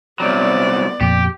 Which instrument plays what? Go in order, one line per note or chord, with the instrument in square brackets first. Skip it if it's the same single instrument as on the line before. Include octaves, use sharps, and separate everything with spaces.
[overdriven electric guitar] C2 F#3 [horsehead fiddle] B3 D5
[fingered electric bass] F2 A#2 [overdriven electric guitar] G4